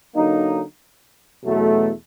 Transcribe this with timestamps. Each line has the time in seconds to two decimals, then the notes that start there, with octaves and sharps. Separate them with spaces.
0.15 D3 F#3 A#3 D#4
1.44 E2 B2 F#3 A3